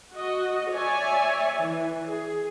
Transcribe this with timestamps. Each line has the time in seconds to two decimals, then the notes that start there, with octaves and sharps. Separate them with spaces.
0.12 F#4 D#5
0.74 C#5 D5 E5 G#5
1.59 E3
2.09 G#4